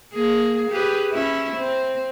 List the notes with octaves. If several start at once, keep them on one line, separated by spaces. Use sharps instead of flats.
A#3 G#4
G4 G#4 B4
C#4 E4
C4